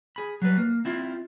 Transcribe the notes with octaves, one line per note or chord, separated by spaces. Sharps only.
G#4 B5
F#3 G3 B4
A#3
C4 E4 F4